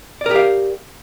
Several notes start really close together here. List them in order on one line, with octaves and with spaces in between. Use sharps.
D5 A#4 G4 F5